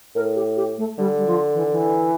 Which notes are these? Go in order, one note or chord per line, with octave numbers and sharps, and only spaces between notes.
A2 A#4
G4
G4
A3
D3 G3
G3
F3
E3
E3